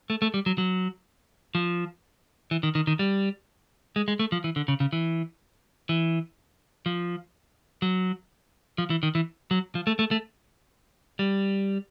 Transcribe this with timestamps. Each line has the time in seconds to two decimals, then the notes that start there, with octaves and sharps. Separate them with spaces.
0.10 A3
0.22 A3
0.34 G3
0.46 F#3
0.58 F#3
1.55 F3
2.51 E3
2.63 D#3
2.75 D#3
2.87 D#3
2.99 G3
3.96 G#3
4.08 G#3
4.19 A3
4.32 F3
4.44 E3
4.56 D3
4.68 C#3
4.80 C#3
4.93 E3
5.89 E3
6.86 F3
7.82 F#3
8.78 F3
8.90 E3
9.03 D#3
9.15 E3
9.51 F#3
9.75 F3
9.87 A3
9.99 A3
10.11 A3
11.19 G3